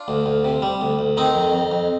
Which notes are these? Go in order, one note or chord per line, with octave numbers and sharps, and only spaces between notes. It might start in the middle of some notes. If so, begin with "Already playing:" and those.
Already playing: D4 F4
D2
D2
C3
G3
D2
D2
D#3 C4 D#4
F2
F2
F2